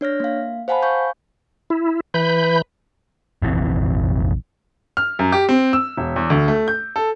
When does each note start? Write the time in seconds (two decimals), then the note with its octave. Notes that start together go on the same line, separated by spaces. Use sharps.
0.01 D4 C#5 F6 A#6
0.20 A#3 F5
0.68 C5 F5 F#5 G#5 A5 B5
0.82 F5 G#5 C#6 G6
1.70 E4
2.14 E3 B4 B5 G6
3.42 F1 A#1 E3 C4
4.97 F6
5.19 F#2
5.32 G4
5.49 C4
5.73 E6
5.97 E1
6.16 E2
6.30 D2
6.48 A3
6.68 G6
6.96 A4